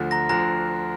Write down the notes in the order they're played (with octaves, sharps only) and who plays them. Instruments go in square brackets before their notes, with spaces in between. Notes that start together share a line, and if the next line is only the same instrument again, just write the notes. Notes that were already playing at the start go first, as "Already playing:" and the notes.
Already playing: [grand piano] D2 D3 F3
[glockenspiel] A#5 A#6
[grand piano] D2 D3 F3 [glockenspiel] A#5 A#6